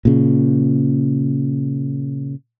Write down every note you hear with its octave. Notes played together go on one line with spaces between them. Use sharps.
A#2 C#3